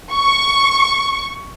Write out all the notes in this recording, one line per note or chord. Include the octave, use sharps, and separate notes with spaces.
C#6